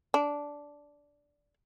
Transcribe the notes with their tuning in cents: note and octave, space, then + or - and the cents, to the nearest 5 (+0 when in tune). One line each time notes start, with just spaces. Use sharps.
D4 -10